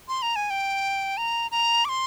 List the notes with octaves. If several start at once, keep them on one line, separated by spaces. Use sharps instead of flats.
C6
A#5
G#5
G5
A#5
A#5
D6
C6